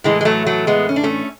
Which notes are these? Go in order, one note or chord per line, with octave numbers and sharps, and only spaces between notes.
A2 E3 G#3
G#3
F#3 A3
F#3 A3
G#3 B3
C#4
D4
A3 C#4